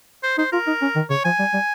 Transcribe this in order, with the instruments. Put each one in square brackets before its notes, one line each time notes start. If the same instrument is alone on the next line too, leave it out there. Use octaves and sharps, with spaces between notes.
[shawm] C5
[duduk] D#4 [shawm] C5
[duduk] F4 [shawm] A#4
[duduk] D#4
C#4
D#3
[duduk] C#3 [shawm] C#5
[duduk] F3 [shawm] G#5
[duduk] G3
G3